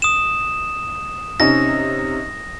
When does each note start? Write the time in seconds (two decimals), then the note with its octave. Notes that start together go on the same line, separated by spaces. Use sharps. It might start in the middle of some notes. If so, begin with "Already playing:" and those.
0.02 D#6 E7
1.40 C3 C#4 D#4 A#6